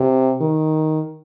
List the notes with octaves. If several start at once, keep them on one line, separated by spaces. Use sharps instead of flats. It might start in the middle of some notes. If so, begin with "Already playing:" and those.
Already playing: C3
D#3